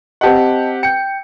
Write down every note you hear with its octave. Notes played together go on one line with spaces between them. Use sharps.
C4 G4 D#5 F#5 A5
G5 G6 C#7